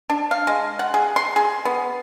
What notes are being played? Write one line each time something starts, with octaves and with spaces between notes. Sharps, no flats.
D4
F5
G#3
F#5
G#4
C6
G#4
B3